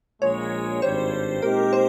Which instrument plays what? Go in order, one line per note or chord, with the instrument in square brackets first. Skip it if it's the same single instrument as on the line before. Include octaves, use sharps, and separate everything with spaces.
[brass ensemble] A#1 A#2 G#3 [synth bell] C#5
[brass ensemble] G#1 G2 G3 [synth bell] C5
[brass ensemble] A#2 G#3 C4 D#4 G4 [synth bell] A#4
[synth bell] C5